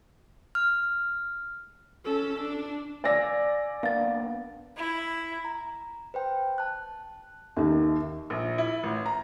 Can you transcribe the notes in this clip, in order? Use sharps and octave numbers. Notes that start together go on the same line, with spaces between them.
F6
C#4 A4
D4
D5 F5 G#5 E6 A#6
A#3 B3 D4 F5 A6
E4
A#5
B4 C5 G5
A5 F#6
D#2 D#3 E5
A#1
E4
A1
A#5